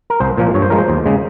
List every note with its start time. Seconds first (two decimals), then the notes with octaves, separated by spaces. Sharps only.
0.10 A#4
0.20 C2 C5
0.37 A#2 F3 A#3
0.54 G2 C#5
0.62 C5
0.70 F3 G#3 A#4
0.78 C5
0.88 D#2
1.06 C#3 G#3